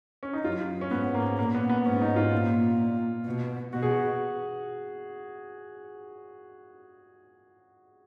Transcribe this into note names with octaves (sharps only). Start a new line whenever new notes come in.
C#4
D#4
F#2 F4
C#4
G#2 B3
A#3
A#2 A#3
B3
B3
G#2 C#4
D#4
F4
A#2
B2
B2 F#4
G#4
F#4